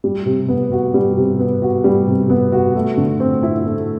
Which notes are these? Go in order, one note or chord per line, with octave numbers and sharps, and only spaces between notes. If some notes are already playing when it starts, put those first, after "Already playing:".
G3
C3
B3
F#4
G3
C3
B3
F#4
G3
C3
B3
F#4
A3
D3
C4
E4
A3